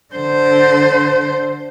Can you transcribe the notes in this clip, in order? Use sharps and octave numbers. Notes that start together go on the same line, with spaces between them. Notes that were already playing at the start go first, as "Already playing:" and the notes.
D3 C5